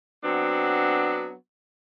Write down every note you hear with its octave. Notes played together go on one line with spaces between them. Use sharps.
F#3 B3 C4 D4